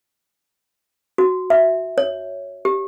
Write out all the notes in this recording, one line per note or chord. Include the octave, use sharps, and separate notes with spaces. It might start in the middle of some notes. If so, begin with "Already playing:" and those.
F#4
E5
C#5
G4